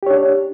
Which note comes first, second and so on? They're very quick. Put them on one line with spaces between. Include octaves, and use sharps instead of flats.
G4 C#5 D4